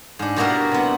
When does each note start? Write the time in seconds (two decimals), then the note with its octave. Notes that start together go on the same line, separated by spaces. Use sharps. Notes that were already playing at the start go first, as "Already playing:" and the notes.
0.19 G#2 D4
0.36 B2 G3 A#3 E4 F#4 A#4
0.71 C3 B3